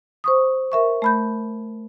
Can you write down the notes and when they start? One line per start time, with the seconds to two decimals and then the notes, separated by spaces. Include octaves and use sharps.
0.24 C5 C#6 D#6
0.72 A#4 E5 C#6
1.02 A3 B5 G6